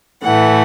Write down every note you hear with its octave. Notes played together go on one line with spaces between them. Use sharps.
A2 E3 A3 F#5